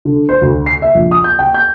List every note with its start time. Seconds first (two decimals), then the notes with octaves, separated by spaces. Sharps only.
0.05 D3
0.29 C5
0.42 D2
0.66 C7
0.82 E5
0.95 A#1
1.11 D#6
1.24 G6
1.39 G5
1.54 G6